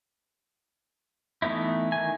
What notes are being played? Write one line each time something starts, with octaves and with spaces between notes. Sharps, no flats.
E3 A3 B3 D#4 E4
D#3 G#5